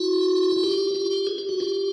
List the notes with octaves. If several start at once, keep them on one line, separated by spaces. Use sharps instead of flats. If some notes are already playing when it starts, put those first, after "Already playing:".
Already playing: E4 F#4
F#4
F4 G4
F4 G4
G#4
G4
F#4
F4 G4